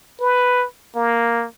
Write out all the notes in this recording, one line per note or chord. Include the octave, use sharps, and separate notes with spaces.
B4
A#3